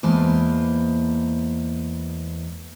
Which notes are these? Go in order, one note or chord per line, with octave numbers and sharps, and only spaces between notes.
E2 G#3 A#3 B4 C5 A5